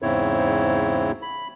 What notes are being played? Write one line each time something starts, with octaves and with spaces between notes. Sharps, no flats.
E2 G#2 C#3 C4 E4 C#5
B5